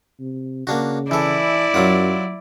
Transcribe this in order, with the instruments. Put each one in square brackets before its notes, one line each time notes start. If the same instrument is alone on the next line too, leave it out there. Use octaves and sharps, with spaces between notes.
[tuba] C3
[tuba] C#3 [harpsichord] A#3 D4 F#4
[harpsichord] E3 A4 [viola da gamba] E4 D5
[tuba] F#2 [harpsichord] F#3 F4 F#5